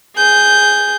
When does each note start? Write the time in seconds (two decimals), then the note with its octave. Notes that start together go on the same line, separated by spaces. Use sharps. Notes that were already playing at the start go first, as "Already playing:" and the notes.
0.15 G#4 G6